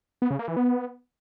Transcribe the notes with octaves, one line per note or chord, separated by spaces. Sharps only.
B3
C#3
A#3
E3
B3